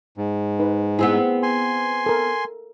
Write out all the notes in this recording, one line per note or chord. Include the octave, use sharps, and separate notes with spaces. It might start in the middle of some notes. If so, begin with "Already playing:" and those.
G#2
D#4 B4
B3 C4 E4 G#4
G#5 C6
A4 A#4